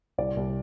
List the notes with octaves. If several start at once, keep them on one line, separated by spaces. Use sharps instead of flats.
C2 D5
C2